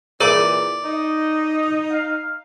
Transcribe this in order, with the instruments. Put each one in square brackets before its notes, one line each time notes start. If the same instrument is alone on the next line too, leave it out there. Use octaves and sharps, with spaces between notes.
[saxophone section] A#2 C#3 E3 [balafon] G#4 A#4 A#5 [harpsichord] D5
[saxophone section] D#4 [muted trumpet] D#5
[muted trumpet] F5